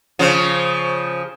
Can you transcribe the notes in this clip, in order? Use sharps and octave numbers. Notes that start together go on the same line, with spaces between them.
C#3 F3